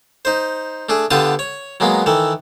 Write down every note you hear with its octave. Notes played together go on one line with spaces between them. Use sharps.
D#4 C5
A3 D4 G#4
D3 B3 F4 G4 A5 D#6
C#5
F#3 G#3 A#3 B3
D#3 E3 A4